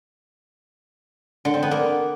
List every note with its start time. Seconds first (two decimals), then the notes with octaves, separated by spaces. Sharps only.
1.45 D3
1.54 C4
1.63 B3
1.71 A#3